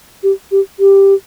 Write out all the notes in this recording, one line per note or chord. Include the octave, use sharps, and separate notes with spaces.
G4
G4
G4